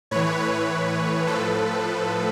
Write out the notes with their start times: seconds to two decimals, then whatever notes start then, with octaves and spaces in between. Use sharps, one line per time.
0.11 A2 E3 B4 C#5
0.40 B4 C#5
1.26 A2 F3 A4 B4